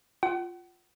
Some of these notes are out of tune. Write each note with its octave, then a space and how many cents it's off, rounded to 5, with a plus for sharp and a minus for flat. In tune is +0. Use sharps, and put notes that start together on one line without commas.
F4 +0 F#5 +40